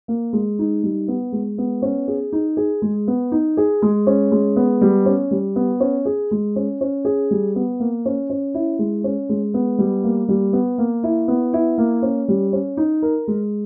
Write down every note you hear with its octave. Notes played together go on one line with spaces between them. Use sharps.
A#3
G#3
D#4
G3
B3
G#3
B3
C#4
G#4
D#4
G#4
G#3
B3
D#4
G#4
G#3
C#4
G#3
B3
G3
C#4
G3
B3
C#4
G#4
G#3
C#4
C#4
G#4
G3
B3
A#3
C#4
C#4
E4
G#3
C#4
G#3
B3
G3
A#3
G3
B3
A#3
E4
B3
E4
A#3
C#4
G3
C#4
D#4
A#4
G#3